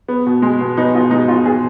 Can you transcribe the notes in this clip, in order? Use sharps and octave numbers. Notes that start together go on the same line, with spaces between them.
B3
B2
G#3
B2
B3 D#4
B2 F4
G#3 D#4
B2 F4
B2 G#4